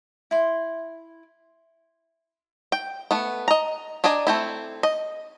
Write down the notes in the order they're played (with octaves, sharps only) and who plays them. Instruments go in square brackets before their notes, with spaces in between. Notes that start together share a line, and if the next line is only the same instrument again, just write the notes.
[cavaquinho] E4 C6
[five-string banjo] G5
A3 B3
D#5 A#5
D4 D5 D#5 G#5 A#5
A3 C4 E4
D#5